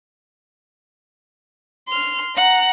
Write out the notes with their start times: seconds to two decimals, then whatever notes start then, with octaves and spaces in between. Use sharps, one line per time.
1.89 C6 F6
2.37 F#5 A#5